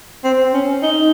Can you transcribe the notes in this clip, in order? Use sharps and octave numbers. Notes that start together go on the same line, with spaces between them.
C4
C#4
D#4